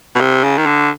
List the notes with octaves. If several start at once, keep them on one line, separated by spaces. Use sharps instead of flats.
B2
C3
C#3
D#3
D3